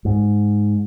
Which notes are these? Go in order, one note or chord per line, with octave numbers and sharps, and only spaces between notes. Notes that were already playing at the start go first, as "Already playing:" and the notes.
G#2